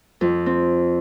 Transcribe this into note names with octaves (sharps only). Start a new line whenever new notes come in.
F2
C4